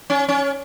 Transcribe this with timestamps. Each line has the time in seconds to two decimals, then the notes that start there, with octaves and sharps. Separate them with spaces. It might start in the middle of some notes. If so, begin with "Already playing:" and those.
0.10 C#4
0.29 C#4